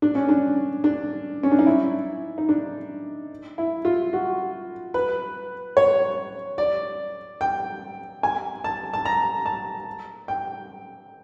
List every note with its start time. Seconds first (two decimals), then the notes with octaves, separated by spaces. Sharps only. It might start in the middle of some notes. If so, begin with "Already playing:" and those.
0.02 D4
0.15 C#4
0.29 D4
0.84 D4
1.43 C#4
1.52 D4
1.59 D#4
1.66 E4
2.38 D#4
2.49 D4
3.58 E4
3.85 F4
4.13 F#4
4.94 B4
5.77 C#5
6.58 D5
7.41 G5
8.23 G#5
8.64 A5
8.93 A5
9.05 A#5
9.46 A5
10.28 G5